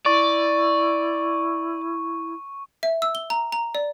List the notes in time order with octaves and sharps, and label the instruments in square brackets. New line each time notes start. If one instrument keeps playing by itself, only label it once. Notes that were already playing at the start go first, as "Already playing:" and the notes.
[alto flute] E4 [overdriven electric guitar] D5 [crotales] C#6
[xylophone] E5
E6
G7
A#5
A#5
D5